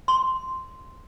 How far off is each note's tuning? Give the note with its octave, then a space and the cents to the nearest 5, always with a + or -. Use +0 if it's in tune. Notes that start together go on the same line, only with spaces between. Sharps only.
C6 -5